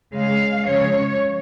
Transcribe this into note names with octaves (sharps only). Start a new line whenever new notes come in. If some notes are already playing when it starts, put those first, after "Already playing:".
C#3 G#3 F5
C#3 F3 G#3 C#5